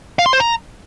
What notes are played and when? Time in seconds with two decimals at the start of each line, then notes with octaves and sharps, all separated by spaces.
0.19 F5
0.26 C6
0.33 C5
0.40 A#5